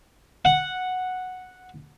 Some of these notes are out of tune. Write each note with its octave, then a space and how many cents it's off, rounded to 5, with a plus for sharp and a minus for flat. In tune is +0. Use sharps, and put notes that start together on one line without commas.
F#5 -5